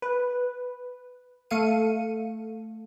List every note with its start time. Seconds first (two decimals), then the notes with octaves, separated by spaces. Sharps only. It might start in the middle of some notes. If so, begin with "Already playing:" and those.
0.02 B4
1.51 A3 A4 F5 C#7 D#7